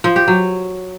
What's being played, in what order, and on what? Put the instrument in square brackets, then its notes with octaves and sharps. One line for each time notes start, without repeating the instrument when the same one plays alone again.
[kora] F3
G4
F#3